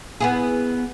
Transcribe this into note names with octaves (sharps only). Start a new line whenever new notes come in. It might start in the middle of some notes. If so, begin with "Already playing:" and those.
B3 E4 G#4